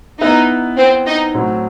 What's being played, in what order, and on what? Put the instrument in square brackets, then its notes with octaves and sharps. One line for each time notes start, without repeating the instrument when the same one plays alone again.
[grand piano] B3 E4 B4 E5 [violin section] D#4
[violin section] C4
D#4
[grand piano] A2 F#3 C4